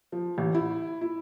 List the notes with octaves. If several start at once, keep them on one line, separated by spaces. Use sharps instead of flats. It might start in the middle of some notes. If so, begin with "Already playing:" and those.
F3
A1
E4
E4